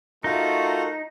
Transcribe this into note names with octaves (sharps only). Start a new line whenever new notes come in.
A3 D#4 F4 F#4 A#4